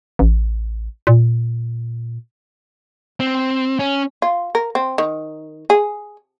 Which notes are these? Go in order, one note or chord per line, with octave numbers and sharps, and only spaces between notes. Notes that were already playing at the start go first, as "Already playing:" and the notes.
A1
A#2
C4
C#4
F4
A#4
C4
D#3
G#4